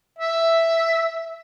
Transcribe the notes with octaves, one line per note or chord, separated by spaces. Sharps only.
E5